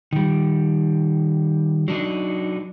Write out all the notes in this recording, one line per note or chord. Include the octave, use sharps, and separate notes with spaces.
D#3 G3
F#3 D4 D#4